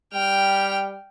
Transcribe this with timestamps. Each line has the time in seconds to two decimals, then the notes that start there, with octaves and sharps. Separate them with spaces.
0.14 G3 G5 F6